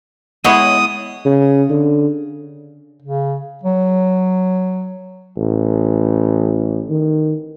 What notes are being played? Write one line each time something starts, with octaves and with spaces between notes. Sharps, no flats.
G#3 B3 E4 C#5 D#5 F#5 D#6
C#3
D3
C#3
F#3
A1
D#3